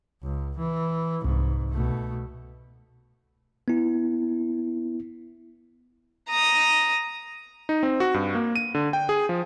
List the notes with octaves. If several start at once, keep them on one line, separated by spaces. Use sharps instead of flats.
C#2
E3
C2 G#2
B2 A3
B3 E4
A#5 D#6
D#4
C4
F#4
G2
A#3
D#7
D3
G5
G#4
F3